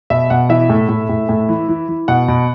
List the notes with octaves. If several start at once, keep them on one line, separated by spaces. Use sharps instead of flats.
B2 E5
B2 F#5
E3 E5
A2
A2
A2
A2
E3
E3
E3
B2 F#5
B2